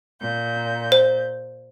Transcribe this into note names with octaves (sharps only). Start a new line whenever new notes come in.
A#2 G6
C5